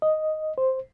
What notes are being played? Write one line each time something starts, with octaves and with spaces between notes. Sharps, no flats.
D#5
C5